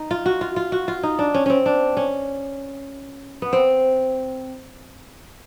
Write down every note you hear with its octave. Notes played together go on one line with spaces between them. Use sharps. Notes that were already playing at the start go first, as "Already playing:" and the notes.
Already playing: D#4
F4
F#4
F4
F4
F#4
F4
D#4
D4
C#4
C4 C#4
D4
C#4
B3
C4